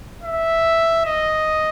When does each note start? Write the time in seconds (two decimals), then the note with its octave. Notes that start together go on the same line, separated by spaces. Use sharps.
0.23 E5
1.05 D#5